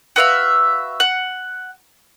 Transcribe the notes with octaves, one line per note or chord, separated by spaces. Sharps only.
F#4 B4 E5 F5
F#5